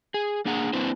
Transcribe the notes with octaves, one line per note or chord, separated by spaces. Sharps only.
G#4
A#3 D4 G#4 F#5 A#5
A#3 C4 D4 E4 B4 C5